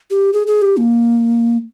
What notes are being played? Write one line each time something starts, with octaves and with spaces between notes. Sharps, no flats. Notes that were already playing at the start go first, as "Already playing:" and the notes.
G4
G#4
G#4
G4
A#3